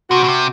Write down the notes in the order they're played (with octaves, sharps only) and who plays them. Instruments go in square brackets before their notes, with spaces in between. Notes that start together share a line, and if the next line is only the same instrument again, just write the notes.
[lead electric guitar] C3 [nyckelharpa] F#4
[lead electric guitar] B2
C3